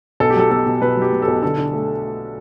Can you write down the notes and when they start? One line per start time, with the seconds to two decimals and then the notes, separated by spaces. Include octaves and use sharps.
0.20 B1 A4
0.30 G4
0.36 F#3 A4
0.50 B2 A4
0.66 B2
0.82 B2 B4
0.97 F#3
1.02 G4
1.12 B2
1.22 A4
1.28 B1
1.42 D3 A4
1.58 D3
1.74 A3